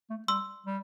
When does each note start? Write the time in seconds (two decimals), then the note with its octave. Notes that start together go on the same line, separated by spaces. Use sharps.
0.10 A3
0.28 G3 C6 E6
0.66 G3